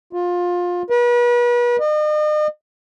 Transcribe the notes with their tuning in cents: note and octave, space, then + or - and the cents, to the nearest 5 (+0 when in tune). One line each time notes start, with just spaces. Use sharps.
F4 +20
B4 -40
D#5 -40